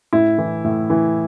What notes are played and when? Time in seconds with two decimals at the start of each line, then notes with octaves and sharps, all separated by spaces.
0.13 A2 E4
0.38 E3
0.64 A2
0.90 E3